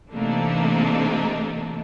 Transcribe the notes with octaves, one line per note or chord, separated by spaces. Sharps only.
C3 E3 A3 A#3 D4 D#4